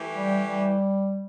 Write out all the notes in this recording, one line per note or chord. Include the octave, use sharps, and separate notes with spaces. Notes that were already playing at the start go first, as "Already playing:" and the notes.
Already playing: E3 A3 G4
G3
G3